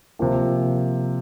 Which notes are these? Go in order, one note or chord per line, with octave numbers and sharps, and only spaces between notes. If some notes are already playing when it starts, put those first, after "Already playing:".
C3 F3 A#3